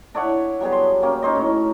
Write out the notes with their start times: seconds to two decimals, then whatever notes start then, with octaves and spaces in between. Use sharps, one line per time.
0.15 D4 E4 C#5 F#5
0.60 F#3 G3 B3 G#4
0.72 C6
1.03 A#3 C#4 G4
1.22 C#4 D#4 C5 D#5
1.35 A2